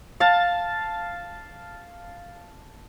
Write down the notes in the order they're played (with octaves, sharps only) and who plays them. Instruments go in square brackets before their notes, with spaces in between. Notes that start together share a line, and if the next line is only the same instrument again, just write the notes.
[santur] F5 A5